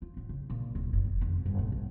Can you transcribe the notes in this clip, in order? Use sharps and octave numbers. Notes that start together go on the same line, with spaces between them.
F4
A1
C#3
A#2
D1
F#1
D#3
F1
G1
A#2
A#1